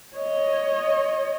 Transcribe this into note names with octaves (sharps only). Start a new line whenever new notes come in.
C#5 D#5